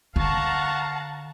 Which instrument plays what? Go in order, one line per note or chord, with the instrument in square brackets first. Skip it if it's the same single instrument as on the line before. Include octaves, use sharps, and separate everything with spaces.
[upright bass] D3 [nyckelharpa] F5 C#6 [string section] F#5 A5 A#5